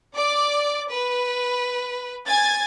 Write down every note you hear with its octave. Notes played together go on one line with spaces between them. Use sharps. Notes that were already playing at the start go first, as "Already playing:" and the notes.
D5 D6
B4
G#5 G#6 A6